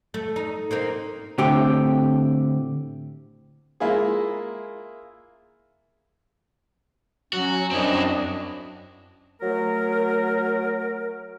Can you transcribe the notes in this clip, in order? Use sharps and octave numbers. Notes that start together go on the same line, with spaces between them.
A3
D#4
A#3 C4 D#4
A2 D3 C4 G4
G#3 A#3 E4 F4 G#4
F#3 C#4 F#4
F#2 C4 D4 E4 D#5
F#3 A3 A#4